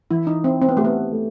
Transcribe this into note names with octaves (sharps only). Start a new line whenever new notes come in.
E3 E4
D#4
C4 E4
C4
B3
A3 G4
B3
A3